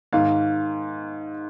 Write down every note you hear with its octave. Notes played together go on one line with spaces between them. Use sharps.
G#2 D#3 F5